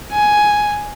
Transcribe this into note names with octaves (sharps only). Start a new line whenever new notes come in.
G#5